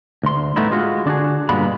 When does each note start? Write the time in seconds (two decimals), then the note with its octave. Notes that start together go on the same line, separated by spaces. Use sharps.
0.23 D2 C6
0.56 A2 A3 B3 D#4 E4
0.71 G#3 F4 F#4
1.06 D3 D4 F4 F#4 G#4
1.49 G2 A#2 D3 G#3 B3 B5